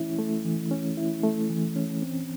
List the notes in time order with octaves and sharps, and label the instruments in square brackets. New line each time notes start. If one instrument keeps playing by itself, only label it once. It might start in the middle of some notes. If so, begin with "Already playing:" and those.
Already playing: [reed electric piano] E3 A3 C#4 E4
A3
E3
C#4
E4
A3
E3
C#4
C4